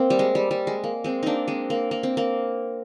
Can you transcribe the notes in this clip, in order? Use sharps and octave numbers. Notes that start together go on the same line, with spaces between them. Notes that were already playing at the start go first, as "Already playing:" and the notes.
Already playing: A#3 C4
G3
G#3
G3
G3
G#3
A#3
G#3 C4
A#3 D4 D#4
G#3 C4
A#3
A#3
C4
A#3